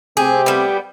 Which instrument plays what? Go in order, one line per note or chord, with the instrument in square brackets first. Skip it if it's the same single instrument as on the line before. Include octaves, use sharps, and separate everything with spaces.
[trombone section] C3 A3 C4 [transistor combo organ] G4 [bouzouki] G#4
[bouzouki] G3 B3